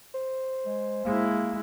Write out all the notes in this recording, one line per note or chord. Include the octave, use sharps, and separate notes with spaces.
C5
G#3
G#3 A#3 E4